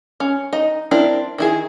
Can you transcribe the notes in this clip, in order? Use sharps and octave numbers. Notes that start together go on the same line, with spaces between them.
C#4
D#4 D#5
C4 D4 E4 A#4
D#3 E4 G#4